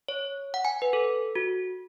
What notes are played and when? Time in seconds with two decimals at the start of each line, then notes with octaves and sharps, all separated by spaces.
0.08 C#5
0.54 F#5
0.65 G#5
0.82 B4
0.93 A4
1.35 F#4